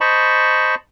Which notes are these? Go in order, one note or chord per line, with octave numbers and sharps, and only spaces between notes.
C5 D#5 A5 B5 C#6